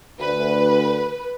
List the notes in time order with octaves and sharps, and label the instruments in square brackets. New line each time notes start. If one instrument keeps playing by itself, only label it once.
[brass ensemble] D2 [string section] B4